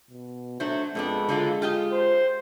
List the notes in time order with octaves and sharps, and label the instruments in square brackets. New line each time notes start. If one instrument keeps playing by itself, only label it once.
[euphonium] B2
[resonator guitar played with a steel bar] F#3 A3 C5 [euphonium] D4
[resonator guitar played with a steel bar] F2 B3 D4 [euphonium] G#3 [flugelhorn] A4
[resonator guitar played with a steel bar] D3 F#3 F4
F4 G4 D#5
[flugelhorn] C5